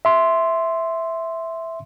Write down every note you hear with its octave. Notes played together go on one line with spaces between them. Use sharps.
E5 C6